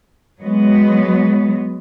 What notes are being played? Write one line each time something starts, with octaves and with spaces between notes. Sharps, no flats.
F#3 G#3 B3